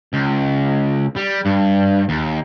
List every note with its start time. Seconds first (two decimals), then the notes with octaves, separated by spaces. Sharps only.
0.14 C#2
1.17 G3
1.46 G2
2.09 D#2